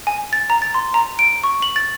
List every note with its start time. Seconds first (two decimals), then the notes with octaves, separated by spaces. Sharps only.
0.07 G#5
0.33 A6
0.50 A#5
0.62 A6
0.74 C6
0.94 A#5
1.19 D7
1.44 C#6
1.62 F#7
1.76 A6